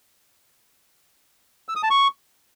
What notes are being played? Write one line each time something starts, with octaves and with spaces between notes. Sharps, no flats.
E6
D#6
A5
C#6